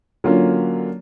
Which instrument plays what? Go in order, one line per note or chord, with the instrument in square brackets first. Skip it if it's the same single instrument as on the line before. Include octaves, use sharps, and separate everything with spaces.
[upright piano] D3 F#3 A#3 C#4 F4